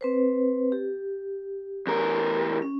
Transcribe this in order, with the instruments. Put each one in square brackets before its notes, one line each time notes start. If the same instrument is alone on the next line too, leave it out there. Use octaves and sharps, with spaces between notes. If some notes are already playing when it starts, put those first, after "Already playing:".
[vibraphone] C4 B4 C5
G4
[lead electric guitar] E2 A#4
[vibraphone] C#4